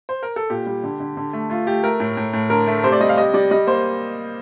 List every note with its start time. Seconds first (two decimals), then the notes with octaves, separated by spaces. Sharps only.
0.09 C5
0.23 A#4
0.36 A4
0.50 A#2 G4
0.66 G3
0.84 D3
1.00 D3
1.17 D3
1.33 A3
1.50 A3 F4
1.67 A3 G4
1.84 A3 A#4
2.00 A2
2.17 A2
2.33 A2
2.50 D3 A#4
2.67 A3
2.84 C3 C5
2.92 D5
3.00 G3 D#5
3.09 F5
3.18 C3 D#5
3.34 G3 D5
3.51 G3 D#5
3.67 A#3 C5